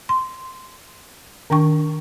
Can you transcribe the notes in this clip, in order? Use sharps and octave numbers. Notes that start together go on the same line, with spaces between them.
C6
D#3 D4 G5 C#6